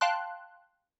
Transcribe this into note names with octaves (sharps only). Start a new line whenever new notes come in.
F5 G5 A5 C6 F#6